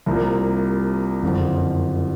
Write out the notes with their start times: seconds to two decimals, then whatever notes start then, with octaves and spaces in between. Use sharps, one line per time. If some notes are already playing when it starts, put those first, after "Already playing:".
0.06 C2 C3 F3 A#3
1.22 F#1 F2 D3 F3